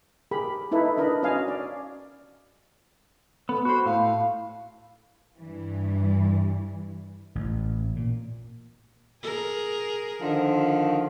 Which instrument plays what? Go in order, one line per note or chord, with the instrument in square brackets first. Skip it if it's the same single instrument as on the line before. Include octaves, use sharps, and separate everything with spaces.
[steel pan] G4 G#4 A#4 B5
D#4 E4 A4 B4
D4 A#4 B4 D#5 B5
C#4 F#4 D#5 F5 G#5
D5
[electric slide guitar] B3 [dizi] A4
[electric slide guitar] F#4 C5 [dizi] B5
[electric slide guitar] A2 [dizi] F5
[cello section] G2 E3
[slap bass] A1
A#2
[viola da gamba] G#4 A#4
[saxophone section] D3 D#3 F3